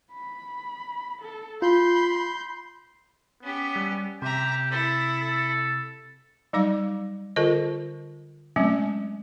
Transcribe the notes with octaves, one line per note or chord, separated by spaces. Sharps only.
B5
A4
F4 B5 C6 G6
B3 C#4 G4
G3
C3 G4 E5 A#5
E4 A4
A4
F#3 G3 D#4 F5 D6
D3 F4 A#4 C5 D#5
F#3 G#3 A3 C4 C#4